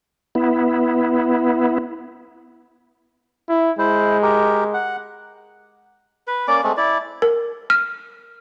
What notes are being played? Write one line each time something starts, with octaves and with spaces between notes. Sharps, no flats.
B3 E4
E4
G#3 E4 C5
G4 A#4
F#5
B4
A#3 C#4 D5 D6
G#3 A3 C4
E4 D5
A#4
F6